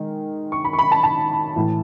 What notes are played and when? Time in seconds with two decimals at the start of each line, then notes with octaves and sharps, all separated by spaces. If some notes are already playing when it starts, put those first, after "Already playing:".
Already playing: D#3 G#3
0.52 C#6
0.65 B5
0.73 C#6
0.79 B5
0.92 A5
1.03 A5
1.56 A2 E3